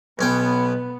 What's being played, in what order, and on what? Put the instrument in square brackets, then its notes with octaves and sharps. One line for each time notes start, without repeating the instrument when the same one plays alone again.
[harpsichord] B1 C#4 G5 [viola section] B3